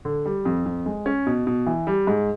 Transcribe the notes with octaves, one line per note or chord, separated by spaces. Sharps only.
D3
G3
F2
F2
G#3
C#4
B2
B2
E3
G3
G#2